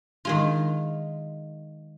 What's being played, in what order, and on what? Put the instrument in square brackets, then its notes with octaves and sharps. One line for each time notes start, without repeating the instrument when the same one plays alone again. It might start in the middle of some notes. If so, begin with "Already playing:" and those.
[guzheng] D#3 G#3 F4